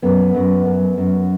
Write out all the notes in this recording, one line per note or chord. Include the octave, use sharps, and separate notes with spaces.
F#2 B3
F#2
F#2
F#2